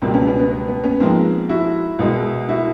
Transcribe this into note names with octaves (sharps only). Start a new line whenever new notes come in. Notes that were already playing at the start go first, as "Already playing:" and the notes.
C#2 B2 G3 A#3 C4
B3 C#4
B3 C#4
B3
B3
B3
B3 C#4
G#2 F3 G#3 A#3 C4
E4 F#4
C2 B2 G#3
E4 F#4